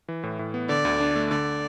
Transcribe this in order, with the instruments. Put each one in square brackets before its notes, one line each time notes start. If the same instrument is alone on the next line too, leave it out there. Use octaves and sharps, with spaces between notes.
[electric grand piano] E3
A2
A2
B3
[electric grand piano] D3 [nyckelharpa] D5
[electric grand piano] D2
D4
A3
[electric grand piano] D3 [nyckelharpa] D5